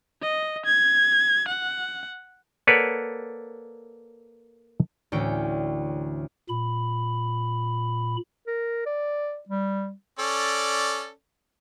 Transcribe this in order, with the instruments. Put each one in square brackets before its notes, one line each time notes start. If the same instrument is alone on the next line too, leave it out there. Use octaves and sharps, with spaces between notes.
[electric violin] D#5
G#6
F#5
[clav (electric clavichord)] A#3 A4 B4 C#5 D5 F#5
[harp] D2 A2 E3 C#4 G5 D7
[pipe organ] A#2 B5
[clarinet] A#4
D5
G3
[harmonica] C#4 A4 D5